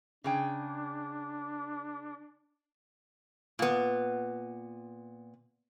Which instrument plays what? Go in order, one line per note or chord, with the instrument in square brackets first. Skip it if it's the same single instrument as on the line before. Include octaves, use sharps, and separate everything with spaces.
[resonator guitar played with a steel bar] C#3 G#4 G5 [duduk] D4
[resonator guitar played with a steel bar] A#2 B3